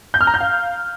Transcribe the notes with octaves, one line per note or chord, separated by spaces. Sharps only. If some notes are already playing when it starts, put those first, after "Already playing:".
G6
F6
A#5
G6
F5